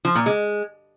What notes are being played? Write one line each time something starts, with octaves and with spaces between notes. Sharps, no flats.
F3
A#2
G#3